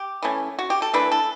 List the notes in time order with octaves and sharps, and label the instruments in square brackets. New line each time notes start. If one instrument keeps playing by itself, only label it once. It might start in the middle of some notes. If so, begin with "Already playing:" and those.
Already playing: [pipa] G4
E3 A3 C#4
F#4
G4
A4
E3 A3 D4 B4
A4